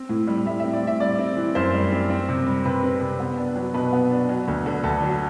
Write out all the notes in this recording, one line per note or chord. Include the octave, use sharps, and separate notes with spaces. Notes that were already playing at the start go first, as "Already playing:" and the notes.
Already playing: C4
A2
G3
A2 E5
C4 E5
D5
A2
E5
G3 D5
C4
E3
F#2 C5
G3
C4
C4
C3
G3
C3 B4
C4
C3
B3
D4
F#3
B2 B4
B3
D4
F#3
D2
D3
D2 A4
F#3